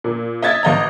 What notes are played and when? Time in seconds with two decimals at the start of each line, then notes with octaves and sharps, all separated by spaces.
0.04 A#2
0.42 D#5 E5 G#6 A6
0.63 A1 D#5 A#5